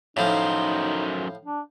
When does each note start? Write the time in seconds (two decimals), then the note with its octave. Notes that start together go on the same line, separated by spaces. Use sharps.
0.17 F#2 A2 F3 D#4 C5
1.45 D4